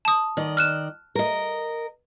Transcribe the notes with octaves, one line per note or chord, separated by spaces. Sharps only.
A5 D#6
D#3 D5 D#5
F6 F#6 E7
A#4 D#5